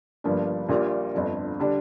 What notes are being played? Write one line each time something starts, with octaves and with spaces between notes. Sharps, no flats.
G1 G2 F3 A#3 D4
A#1 A#2 G3 A#3 F4
G1 F2 D3
D3 G3 D4